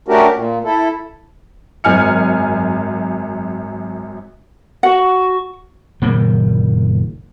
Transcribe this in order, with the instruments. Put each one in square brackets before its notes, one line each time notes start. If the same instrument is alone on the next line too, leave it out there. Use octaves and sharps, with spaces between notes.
[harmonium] A3 C#4 D4 F#4 G4 A#4
A#2
E4 A4
[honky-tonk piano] G#1 F#2 G#5 F6 C#7
[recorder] F#4 [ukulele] F#5
[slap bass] F#1 A#2 D#3 A#3